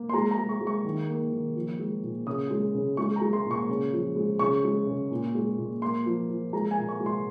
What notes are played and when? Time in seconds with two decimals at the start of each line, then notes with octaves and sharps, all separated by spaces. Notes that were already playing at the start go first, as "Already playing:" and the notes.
Already playing: A#3
0.09 C6
0.13 G#3 A#5
0.31 A#5
0.37 G#3
0.49 C#6
0.61 G#3
0.67 C#6
0.85 D#3
1.09 A#3
1.32 D#3
1.56 F3
1.79 G#3
2.03 A#2
2.26 C#3 D#6
2.50 G#3
2.74 C#3
2.97 G#3 C#6
3.16 A#5
3.21 G#3
3.33 C6
3.46 A#2
3.51 C#6
3.69 C#3
3.93 F3
4.16 G#3
4.39 C#3 C#6
4.64 G#3
4.87 C#3
5.11 A#2
5.34 G#3
5.58 A#2
5.82 A#3 C6
6.06 F3
6.29 F3
6.53 G#3 A#5
6.71 G#5
6.77 A#2
6.89 C#6
7.00 G#3
7.06 C6